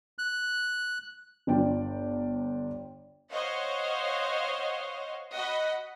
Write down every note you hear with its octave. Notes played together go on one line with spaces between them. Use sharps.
F#6
G1 D4 F4 D5 G5
C5 C#5 D#5 F5 F#5
F#4 D#5 F#5 B5